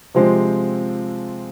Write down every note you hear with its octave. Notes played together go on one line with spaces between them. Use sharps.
C3 F3 G#3 C4